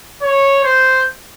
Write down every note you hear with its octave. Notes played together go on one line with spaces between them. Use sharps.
C#5
C5